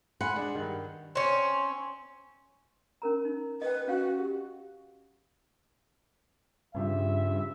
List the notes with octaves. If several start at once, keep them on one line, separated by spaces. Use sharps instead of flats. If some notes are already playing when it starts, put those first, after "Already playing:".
F#5 G#5 B5 C6
G#3 D4
G2 D#3
C4 C#4
C#4 A#4 A#5
D#4
B4 D#5 G5
C#4 F#4 F5 G5
G4
G2 C#3 F4 G4 E5